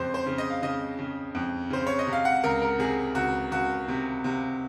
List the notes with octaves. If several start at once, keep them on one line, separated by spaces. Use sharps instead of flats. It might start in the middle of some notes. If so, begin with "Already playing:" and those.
Already playing: F2 C#3 C5
C5
C#3
D#5
F5
C#3 D#5
C#3
F2
C#3 C5
C#5
D#5
C3
F5
F#5
C#2 A#4
A#4
C3 G#4
C#2 F#4
C#2 F#4
C3
C3